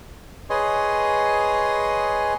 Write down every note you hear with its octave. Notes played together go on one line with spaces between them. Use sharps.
G#4 B4 C#5 D#5 G#5 C6